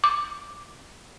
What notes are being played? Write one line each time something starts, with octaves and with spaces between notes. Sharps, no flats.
D6